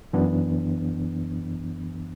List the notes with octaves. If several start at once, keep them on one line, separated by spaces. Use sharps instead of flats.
F#2 E3 B3 D4